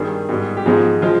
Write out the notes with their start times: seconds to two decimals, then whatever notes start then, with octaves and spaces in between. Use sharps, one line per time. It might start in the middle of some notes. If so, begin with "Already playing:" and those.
Already playing: G2 D#3 G3 G#4
0.29 G#2 G3
0.57 G4
0.66 G#2 F3 G#3 G#4
1.02 F3 G#3 F4